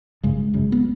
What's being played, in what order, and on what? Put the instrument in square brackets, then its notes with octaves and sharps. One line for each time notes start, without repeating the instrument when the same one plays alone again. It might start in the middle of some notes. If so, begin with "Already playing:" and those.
[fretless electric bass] G#1 F#2 C#3 G#3
G#1 F#2 C#3
B3